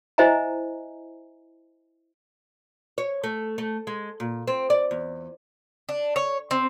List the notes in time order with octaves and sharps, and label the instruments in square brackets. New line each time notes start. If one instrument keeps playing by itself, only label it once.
[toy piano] E4 C5 D#5 E5 G#5 A#5
[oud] C#5
A3
A3
G#3
A#2
C4
D5
E2
[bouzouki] D4
C#5
C4